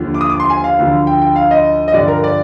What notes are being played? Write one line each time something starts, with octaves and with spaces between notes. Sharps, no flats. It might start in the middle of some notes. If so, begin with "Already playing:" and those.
Already playing: D#2 D3 F3
D6
D#6
D6
C6
G#5
F5
D2 D3 F3
G5
G5
F5
D#5
D#5
G2 D3 F3 D5
A#4
D5